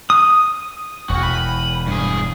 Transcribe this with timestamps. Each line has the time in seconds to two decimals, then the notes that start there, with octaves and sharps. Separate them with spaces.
0.10 D#6
1.09 E1 E2 F#4
1.23 B5
1.87 G2 G#4